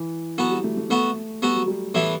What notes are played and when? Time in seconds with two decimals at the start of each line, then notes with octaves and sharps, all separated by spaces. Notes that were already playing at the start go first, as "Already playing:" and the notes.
Already playing: E3
0.38 F#3 B3 F#4 A4
0.51 G3
0.64 A3
0.77 A3
0.90 A3 B3 F#4 A4
1.42 G3 B3 F#4 A4
1.55 F#3
1.68 G3
1.95 A2 E3 G3 B3 E4 A4